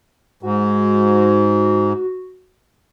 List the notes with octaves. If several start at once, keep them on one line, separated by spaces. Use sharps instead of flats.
G#2 F#4